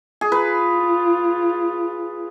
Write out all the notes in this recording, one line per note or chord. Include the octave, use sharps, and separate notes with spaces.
G#4
F4 B4